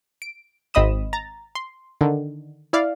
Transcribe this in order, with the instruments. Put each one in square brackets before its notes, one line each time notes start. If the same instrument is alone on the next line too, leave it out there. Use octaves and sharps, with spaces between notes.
[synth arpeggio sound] D7
G#1 C4 D#5 B5 D#6 E7
A#5 A6
C6
D3 D#3
E4 D5 F5